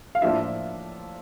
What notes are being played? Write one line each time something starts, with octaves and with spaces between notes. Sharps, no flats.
F5
A2 F3 A#3 D4 F4 E5